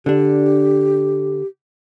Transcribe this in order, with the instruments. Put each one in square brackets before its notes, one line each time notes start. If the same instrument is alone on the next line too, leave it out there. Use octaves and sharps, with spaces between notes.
[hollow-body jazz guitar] D3 D4 [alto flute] G4